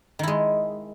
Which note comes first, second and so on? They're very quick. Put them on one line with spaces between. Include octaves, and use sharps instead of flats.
D#3 E4 G#3